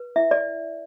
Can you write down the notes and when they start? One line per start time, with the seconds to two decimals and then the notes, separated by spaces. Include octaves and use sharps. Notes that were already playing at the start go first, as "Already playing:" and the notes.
Already playing: B4
0.16 E4 E5
0.31 D5